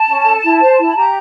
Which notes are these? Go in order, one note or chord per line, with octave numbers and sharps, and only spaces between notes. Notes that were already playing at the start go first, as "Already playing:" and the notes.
Already playing: A5
C#4
A4
E4
C5
E4
B5
G4 A#5